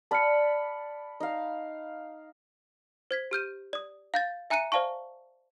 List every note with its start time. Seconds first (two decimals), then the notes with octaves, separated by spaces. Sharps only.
0.11 D5 A5 B5 F6 C#7
1.20 D#4 F5
3.11 C5 G#6 B6
3.31 G4 F6 G6 D#7
3.73 D5 D#6
4.14 F5 G6 A6
4.50 E5 G#5 A#5 F#6 C#7 D#7
4.72 C5 D5 F5 A5 C#6